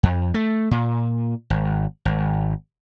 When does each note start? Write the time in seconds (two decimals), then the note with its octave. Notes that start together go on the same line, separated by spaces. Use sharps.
0.03 F2
0.34 A3
0.71 A#2
1.50 G#1
2.05 G#1